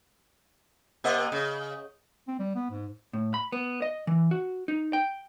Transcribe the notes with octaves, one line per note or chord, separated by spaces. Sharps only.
C3 A#3 D#5
C#3
C4
G3
B3
G#2
A2
B5
B3
D#5
E3
F#4
D#4
G5